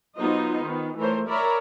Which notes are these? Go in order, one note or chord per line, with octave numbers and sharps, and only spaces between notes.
F#3 B3 D#4 F4 C5 D#5
D#3 B3
E3 A3 A#4 C5 C#5
A#4 C#5 D5 E5 A#5 B5